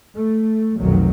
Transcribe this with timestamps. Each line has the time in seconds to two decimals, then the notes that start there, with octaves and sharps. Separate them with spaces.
0.14 A3
0.77 F1 B1 D#3 F#3